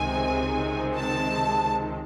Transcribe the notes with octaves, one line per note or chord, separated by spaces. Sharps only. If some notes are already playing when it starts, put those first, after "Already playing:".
Already playing: C#2 C3 D#3 G#3 C4 G#5
A5